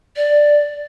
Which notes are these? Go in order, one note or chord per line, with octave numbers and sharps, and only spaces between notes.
D5